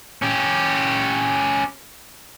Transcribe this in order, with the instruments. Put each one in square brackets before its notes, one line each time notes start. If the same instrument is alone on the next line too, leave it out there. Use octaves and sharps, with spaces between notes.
[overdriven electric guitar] C#4 G4